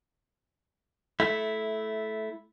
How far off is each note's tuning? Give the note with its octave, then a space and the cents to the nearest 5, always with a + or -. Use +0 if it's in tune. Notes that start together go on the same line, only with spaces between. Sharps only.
A3 -15 E4 +0